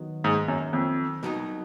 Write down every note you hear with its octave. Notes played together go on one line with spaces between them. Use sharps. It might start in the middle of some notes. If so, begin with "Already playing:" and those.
Already playing: D#3 F#3 B3
G#2
F#2
F2
C2 B2 F#3 B3 D#4